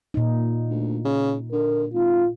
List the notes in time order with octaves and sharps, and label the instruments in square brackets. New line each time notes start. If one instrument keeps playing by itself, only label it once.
[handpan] A#2 D#4
[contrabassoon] D2
C#3
[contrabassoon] D3 [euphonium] A#4
[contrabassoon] G#1 [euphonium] F4